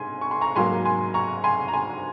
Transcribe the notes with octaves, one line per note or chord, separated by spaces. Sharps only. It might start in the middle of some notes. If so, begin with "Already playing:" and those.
Already playing: G#2 G#5 C6
C#6
C6
A#5 C#6
G#2 F#3 A#3 G#5 C6
G#5 C6
A#5 C#6
G#5 C6
A#5
G#5 C6